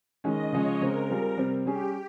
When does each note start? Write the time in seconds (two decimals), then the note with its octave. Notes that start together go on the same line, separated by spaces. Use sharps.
0.24 D#3 G#3 C#4 D#5
0.52 C#3 F3 G#3 C#4 C#5
0.81 C#3 G#3 C4 A#4
1.09 G3 C4 F4 G#4
1.37 C3 G3 C4
1.66 G3 C#4 G4 G#4